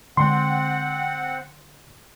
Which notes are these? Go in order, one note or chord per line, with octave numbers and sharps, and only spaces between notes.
D3 G#3 C4 F#5 C6